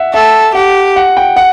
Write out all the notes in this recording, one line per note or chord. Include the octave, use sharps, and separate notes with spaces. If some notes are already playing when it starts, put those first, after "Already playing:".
Already playing: E5 F#5
A4 E5
G4 F#5
F#5
G5
F#5